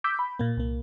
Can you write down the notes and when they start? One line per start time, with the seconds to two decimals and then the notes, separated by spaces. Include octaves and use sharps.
0.04 D6 E6 G6 B6
0.19 B5
0.39 A#2 A#3
0.57 C2 A#3